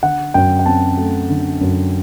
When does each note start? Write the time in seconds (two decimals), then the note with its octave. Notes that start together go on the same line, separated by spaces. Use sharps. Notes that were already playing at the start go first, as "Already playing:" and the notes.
0.03 D3 F#5
0.34 F#2 G5
0.59 G5
0.66 C4 A5
0.97 A3
1.30 D3
1.61 F#2